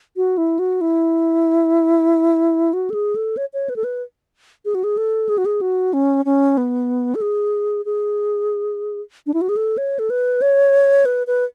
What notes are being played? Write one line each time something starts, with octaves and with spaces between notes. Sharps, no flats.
F#4
E4
F#4
E4
F#4
A4
G#4
A4
C#5
C#5
B4
A4
B4
G#4
F#4
G#4
A4
G#4
F#4
G#4
F#4
C#4
C#4
B3
A4
G#4
G#4
D4
E4
F#4
G#4
A4
C#5
A4
B4
C#5
B4
B4